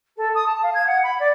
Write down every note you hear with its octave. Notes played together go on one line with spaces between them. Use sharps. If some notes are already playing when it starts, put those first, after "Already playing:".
A4
D#6
A5
F5
G#6
F#5
B5
D5